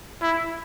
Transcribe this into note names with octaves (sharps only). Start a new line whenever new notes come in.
E4